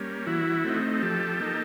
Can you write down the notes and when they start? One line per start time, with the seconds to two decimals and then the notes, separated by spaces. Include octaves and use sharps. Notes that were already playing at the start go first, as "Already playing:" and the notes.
Already playing: G3 A#3 C#4
0.26 E3 E4 F#4
0.64 A3 C4 D#4
1.02 F3 G4 A4
1.40 A#3 D#4